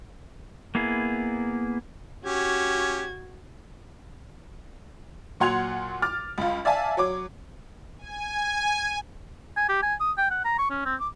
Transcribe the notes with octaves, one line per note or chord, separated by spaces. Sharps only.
A#3 B3 E4 G#4
C#4 F#4 G4 G#6
A#2 F#3 F#5 C6 G#6 F7
D6 F6 A6
C#2 F4
D5 E5 F5 G#5 A5
F#3 C#5 D6
G#5
G#5
G4
G#5
D#6
G5
F#5
A#5
C#6
C#4
C4
D6